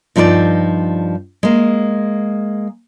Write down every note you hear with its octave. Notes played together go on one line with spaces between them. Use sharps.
G2 F3 D#4 A#4 D5
G#3 A#3